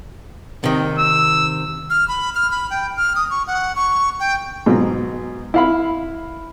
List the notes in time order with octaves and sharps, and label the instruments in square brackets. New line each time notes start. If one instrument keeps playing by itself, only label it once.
[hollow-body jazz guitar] C3 D#3
[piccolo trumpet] E6
[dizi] F6
B5
F6
B5
G5
F6
D#6
C#6
F#5
C#6
G5
[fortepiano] G#2 B2 F#3
E4 F5 B5